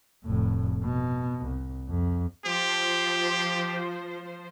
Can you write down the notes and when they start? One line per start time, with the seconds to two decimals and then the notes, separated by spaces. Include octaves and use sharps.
0.24 F1 A2
0.84 B2
1.45 C2
1.89 F2
2.45 F3 G4 C5